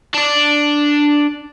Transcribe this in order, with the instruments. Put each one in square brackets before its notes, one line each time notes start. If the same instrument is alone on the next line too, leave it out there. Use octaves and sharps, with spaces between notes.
[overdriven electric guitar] D4 D5